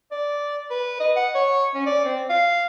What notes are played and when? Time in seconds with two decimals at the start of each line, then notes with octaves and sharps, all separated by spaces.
0.12 D5
0.71 B4
1.00 D#5
1.16 F#5
1.35 C#5
1.75 C#4
1.86 D5
2.05 C4
2.30 F5